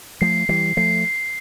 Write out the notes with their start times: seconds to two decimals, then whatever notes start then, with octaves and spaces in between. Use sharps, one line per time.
0.21 F3 A3 C7
0.49 E3 G3 C7
0.77 F3 A3 C7
1.05 C7